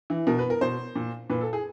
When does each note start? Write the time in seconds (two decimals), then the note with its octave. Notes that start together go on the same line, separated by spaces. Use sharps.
0.10 E3
0.27 B2 A#4
0.39 B4
0.50 A#4
0.61 B2 C5
0.96 A#2
1.30 A#2 B4
1.41 A4
1.53 G#4